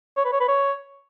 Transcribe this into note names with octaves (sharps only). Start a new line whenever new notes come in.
C#5
B4
C#5
B4
C#5